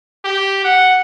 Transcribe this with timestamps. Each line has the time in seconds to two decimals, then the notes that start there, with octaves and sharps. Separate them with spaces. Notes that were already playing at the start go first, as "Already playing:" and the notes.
0.24 G4
0.64 F#5